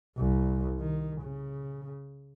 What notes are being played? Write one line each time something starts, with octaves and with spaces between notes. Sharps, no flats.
C2
D#3
C#3